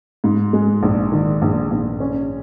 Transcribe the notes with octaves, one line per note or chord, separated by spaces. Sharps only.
G#2
G#3
A#1
D#3
A#1
A#1
C#4